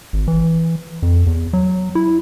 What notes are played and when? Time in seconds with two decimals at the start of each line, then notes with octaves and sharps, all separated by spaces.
0.13 G#1
0.28 E3
1.02 F2
1.27 E2
1.53 F#3
1.95 E4